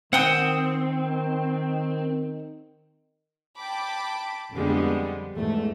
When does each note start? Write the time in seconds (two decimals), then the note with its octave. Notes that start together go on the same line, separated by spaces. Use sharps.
0.13 D#3 C4 F#5 G5 D#6
3.60 G5 A5 B5 D6
4.55 F2 D3 G3 G#3 B3
5.35 E2 G#2 A3